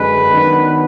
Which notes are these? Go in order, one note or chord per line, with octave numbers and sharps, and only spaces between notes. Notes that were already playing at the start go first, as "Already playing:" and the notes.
Already playing: F#2 D3 G#3 B4
D#3 F#3 B3 D4